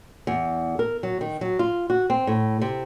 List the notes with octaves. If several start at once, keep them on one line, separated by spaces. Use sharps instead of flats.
E2
A#4
F#3
D#3
F#3
F4
F#4
C4
A2
C3